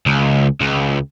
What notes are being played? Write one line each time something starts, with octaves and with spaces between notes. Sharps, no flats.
C#2
C#2